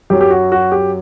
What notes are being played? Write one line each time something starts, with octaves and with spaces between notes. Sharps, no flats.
F#2 F#3 G4
G4
F#4
F#4
G4